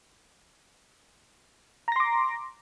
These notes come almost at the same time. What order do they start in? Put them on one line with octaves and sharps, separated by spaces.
A#5 A#6 C6 D6